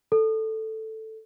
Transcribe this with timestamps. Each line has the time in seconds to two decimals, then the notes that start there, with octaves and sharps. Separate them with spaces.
0.12 A4